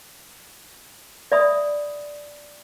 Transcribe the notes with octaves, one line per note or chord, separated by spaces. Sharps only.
D5 E5 B5 D#6